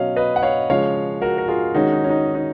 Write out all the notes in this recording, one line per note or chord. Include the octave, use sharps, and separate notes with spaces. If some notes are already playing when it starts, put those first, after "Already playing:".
Already playing: B2 F#3 C#4 C#5 D#5 F5
B4 D#5
F#5
C#5 F5
C#3 F3 G#3 C#5 F5
F#4 A#4
A#4
F4 G#4
D#3 G#3 C#4 D#4 F#4
D#4
C#4
D#4
D#4